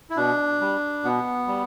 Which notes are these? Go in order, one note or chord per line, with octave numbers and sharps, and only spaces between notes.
E4
B2 D4
G3
B2 B3
G3